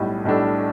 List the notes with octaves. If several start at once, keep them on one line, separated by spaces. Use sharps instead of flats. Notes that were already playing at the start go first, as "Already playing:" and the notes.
Already playing: B1 A2 G3
B1 A2 G3 D4 A4